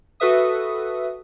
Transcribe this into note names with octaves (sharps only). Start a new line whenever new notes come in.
F#4 A4 B4 E5 D#6